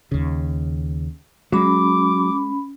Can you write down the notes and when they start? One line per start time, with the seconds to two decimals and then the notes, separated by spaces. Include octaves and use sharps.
0.12 D#2 C#3
1.52 F#3 G#3 C#4 B5 D6